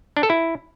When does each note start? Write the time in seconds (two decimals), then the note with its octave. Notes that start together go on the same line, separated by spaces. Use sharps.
0.17 D4
0.23 A4
0.30 E4